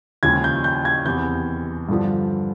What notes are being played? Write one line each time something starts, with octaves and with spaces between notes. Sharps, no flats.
D#2 C#3 F3 G#3 G#6
G6
G6
G#6
E2 C3 E3 G6
G2 D3 F3